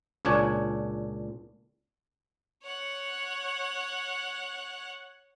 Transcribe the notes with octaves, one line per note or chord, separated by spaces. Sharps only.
C#2 A#2 D4 C#5 G#5
C#5 F#5